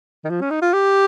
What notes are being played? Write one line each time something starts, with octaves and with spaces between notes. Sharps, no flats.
D#3
F3
C#4
D#4
F4
G4